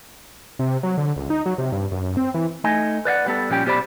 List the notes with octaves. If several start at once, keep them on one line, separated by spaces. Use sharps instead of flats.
C3
F#3
D3
C#2
D#4
F#3
C3
G2
F#2
C4
E3
A3 D#4 D#5 G#5
B4 D5 F5 F#5
G3 B3 A4
A#2 F3 G3 C#4 G4 G5
B1 B3 G4 C5 D5 B5